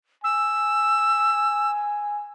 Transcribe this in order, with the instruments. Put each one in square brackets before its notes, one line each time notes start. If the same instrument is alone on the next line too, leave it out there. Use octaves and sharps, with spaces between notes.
[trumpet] G#5 [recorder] E6